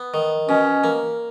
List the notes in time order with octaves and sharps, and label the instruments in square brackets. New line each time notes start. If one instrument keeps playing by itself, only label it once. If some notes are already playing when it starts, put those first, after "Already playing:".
Already playing: [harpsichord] B3
D#3
[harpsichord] B2 [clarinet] C#4
[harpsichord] A#3